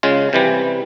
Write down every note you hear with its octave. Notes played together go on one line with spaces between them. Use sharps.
C#3 G#3 F4
C3 E3 G3